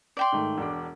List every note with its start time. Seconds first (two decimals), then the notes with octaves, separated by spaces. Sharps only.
0.17 D5 G5 C6
0.32 G#2 D#3 A3
0.58 E1 D4 D6